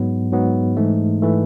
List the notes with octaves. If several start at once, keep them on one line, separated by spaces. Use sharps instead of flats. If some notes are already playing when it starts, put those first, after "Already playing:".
Already playing: G#2 F#3 B3
G#2 F#3 B3
G#2 E3 A3
E3 A3